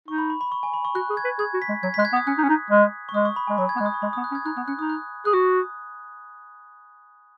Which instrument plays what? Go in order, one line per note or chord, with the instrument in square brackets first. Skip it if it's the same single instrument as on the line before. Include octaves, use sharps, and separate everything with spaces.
[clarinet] D#4 [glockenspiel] C#6
[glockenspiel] B5
B5
B5
C#6
G#5
B5
C#6
[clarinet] F#4 [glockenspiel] F#6
[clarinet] G#4
[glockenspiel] G#6
[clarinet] B4
[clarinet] G#4 [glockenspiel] G#6
[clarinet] F#4
[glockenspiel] B6
[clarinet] G#3
[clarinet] F#3 [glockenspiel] G#6
[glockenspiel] B6
[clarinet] G#3 [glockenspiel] F#6
[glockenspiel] G#6
[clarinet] B3
[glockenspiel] D#6
[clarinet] C#4 [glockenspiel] F#6
[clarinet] D#4
C#4
D#4
G#3
[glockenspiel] C#6
[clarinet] G#3 [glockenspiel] D#6
[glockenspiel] C#6
B5
[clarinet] G#3 [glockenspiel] G#5
[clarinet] F#3 [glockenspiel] B5
[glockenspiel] G#6
[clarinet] G#3 B3 [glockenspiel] F#6
[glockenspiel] D#6
C#6
[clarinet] G#3 [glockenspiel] B5
[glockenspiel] D#6
[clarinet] B3
[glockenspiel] F#6
[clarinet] C#4
[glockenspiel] G#6
[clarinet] D#4 [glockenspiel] F#6
[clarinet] B3 [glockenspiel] F#6
[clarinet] C#4 [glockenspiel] F#6
[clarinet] D#4 [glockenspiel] D#6
[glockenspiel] F#6
[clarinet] G#4 [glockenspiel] F#6
[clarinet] F#4 [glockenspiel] D#6